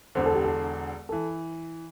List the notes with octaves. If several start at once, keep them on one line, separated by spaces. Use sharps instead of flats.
E1 E2 D3 C5
A4
G4
A4
E3 A4